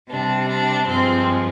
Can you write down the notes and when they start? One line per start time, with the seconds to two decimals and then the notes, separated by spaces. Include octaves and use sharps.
0.09 C3 G3 D4
0.47 D4
0.86 G2 F3 G#3 C4